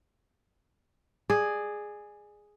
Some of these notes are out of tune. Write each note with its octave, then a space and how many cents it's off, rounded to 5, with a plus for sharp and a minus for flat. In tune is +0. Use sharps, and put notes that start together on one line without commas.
G#4 +0 D5 +25